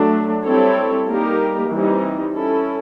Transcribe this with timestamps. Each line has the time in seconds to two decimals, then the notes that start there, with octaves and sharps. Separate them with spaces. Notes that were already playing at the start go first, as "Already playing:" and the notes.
Already playing: F#3 A3 D4
0.44 G3 C4 E4 A4 C#5
1.07 G3 A#3 D#4 G4 A#4
1.70 E3 G3 C4 D#4
2.34 C#4 E4 A4